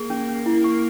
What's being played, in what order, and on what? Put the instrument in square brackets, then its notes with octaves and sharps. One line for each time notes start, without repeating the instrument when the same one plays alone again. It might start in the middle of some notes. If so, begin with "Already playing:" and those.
Already playing: [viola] A#3 [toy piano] G#4
[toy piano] C#4
C#4
E4
C#6